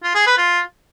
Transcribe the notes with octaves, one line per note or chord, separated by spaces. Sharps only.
F4
G#4
B4
F4